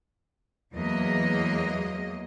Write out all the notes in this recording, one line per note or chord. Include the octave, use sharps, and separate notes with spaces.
E2 F#3 G#3 A#3 D#5